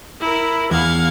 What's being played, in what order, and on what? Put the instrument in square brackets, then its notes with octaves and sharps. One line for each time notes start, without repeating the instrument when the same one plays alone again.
[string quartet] E4 A#4
[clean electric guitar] E2 [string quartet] F5 F#5 G#6